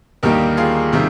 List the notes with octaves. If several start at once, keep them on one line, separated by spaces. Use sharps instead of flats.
D#2 D3 G3 A#3 D#4 G4 A#4
F4 G#4
C3 D#3 G3